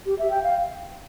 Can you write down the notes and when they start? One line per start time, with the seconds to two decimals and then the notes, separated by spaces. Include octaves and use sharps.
0.06 G4
0.19 E5
0.30 G5
0.43 F5